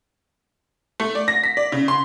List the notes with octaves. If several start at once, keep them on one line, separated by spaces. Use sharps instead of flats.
A3
D5
A#6
B6
D5
C#3
C6